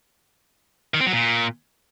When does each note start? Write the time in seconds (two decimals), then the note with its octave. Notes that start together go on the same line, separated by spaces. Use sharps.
0.94 D#3
1.00 C4
1.07 F#3
1.13 A#2